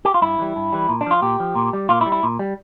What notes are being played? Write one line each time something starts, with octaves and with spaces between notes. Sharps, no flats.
G4
F4
G2 E4
E3 G3
G2
E3 G3
A#2
D4
F3 F4
A#2 G4
F3
A#2
G3
A#2 F4
E4
G3
E4
A#2
G3